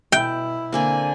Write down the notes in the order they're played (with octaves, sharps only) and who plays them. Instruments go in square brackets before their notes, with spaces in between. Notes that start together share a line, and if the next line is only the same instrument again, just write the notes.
[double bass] B2 E4 [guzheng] G5
[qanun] D3 A#3 C4 [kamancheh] G#5